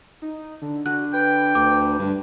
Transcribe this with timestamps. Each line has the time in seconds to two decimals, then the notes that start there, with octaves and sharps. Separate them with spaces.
0.22 D#4
0.62 D3
0.86 D3 F#4 F#6
1.13 B4 G5
1.55 D2 D6
1.99 G2